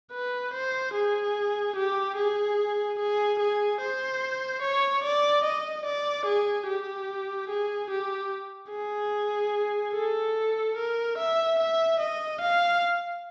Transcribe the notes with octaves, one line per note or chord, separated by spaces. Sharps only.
B4
C5
G#4
G4
G#4
G#4
G#4
C5
C#5
D5
D#5
D5
G#4
G4
G#4
G4
G#4
A4
A#4
E5
E5
D#5
F5